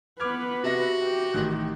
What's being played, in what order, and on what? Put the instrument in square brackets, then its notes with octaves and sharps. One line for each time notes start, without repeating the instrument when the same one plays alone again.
[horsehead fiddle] B3 B4 [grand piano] D6 F6 G#6
[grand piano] C3 E5 A#6 [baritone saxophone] F#4
[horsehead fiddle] G4
[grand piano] A1 D#3 F#6